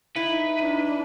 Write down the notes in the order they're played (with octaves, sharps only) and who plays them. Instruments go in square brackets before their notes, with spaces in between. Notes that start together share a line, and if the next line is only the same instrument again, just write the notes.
[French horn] D#4 [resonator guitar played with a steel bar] E4 [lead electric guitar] B4
[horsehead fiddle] D4